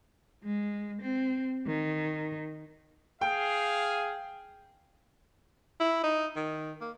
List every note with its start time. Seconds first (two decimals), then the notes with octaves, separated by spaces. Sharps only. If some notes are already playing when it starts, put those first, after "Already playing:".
0.44 G#3
1.02 C4
1.66 D#3
3.21 G#4 F5 G5
5.80 E4
6.04 D#4
6.36 D#3
6.81 A#3